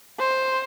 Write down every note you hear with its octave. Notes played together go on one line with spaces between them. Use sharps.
C5